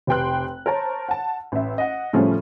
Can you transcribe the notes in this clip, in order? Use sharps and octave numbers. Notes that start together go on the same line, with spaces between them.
F1 G4 B4 G5 C6 F#6
A#4 C5 C#5 A5
F#5 A5
A1 E5
D#5 F#5
A2 C#3 F3 G3 A3 C#4